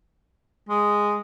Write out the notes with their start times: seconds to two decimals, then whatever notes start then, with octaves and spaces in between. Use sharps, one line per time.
0.69 G#3